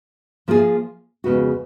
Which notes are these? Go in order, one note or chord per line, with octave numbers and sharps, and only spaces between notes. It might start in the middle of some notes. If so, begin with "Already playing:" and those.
F3 A#3 F4 G#4
F2 C#3 G#3 B3 F#4